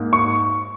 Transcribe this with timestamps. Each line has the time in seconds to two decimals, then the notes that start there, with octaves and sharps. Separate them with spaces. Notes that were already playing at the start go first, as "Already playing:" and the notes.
Already playing: G#2 A#3
0.13 C#6